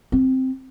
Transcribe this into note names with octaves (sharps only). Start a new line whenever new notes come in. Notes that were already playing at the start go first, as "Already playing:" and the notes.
C4